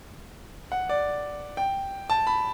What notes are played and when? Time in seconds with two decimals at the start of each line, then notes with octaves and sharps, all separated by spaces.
0.72 F#5
0.89 D5
1.57 G5
2.10 A5
2.27 B5